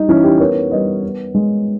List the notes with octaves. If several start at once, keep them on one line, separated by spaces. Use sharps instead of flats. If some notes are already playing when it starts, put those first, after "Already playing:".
Already playing: G3 D#4
E3 C#4 E4
D#4 G4
B3 A#4 C#5
G3 B4 D#5
B3
G#3